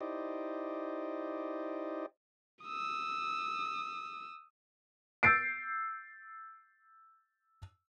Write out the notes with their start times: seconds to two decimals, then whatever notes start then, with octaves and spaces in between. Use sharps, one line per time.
0.01 D#4 E4 G4 C5 D5 D#5
2.64 D#6 E6
5.23 E6 G6 A6 C7 D7